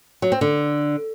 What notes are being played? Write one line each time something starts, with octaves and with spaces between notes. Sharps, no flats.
F#3
C4
D3